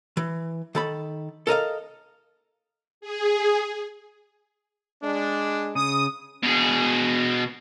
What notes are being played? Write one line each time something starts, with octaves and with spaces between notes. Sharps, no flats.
E3
D#3 A4 B5
A4 A#4 D#5 F5
G#4
G#3 D4
C#3 D#6
B2 G#4